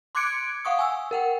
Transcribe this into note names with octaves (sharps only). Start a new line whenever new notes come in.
C6 D6 F#6 G#6 C#7 D7
F5 F#5 C#6 D#6
G#5 E6
A#4 F#5 G5